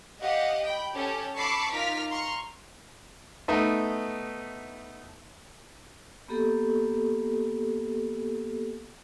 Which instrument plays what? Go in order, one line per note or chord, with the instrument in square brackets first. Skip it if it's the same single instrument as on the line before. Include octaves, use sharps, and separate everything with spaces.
[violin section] G4 D#5 F5 F#5
G5 B5
C#4 G4 A4
A5 B5 C#6 D6 E6 C7
D#4 F4 A#4 D6 F6 B6
A#5 C6 C#6 F6
[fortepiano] A3 B3 D#4 E5
[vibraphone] A#3 B3 G4 A4